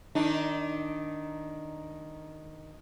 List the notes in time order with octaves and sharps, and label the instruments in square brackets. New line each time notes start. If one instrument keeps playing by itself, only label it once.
[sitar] D#3 D4 D#4